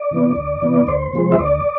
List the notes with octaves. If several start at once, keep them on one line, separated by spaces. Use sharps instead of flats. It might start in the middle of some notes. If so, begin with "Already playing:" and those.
Already playing: D5
C3 E3 B3
D2
C3 E3 B3
D2 C5
C3 F3 G#3
E5
D2 D5